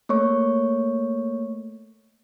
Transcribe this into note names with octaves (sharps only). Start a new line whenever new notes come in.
A3 A#3 C#5 C#6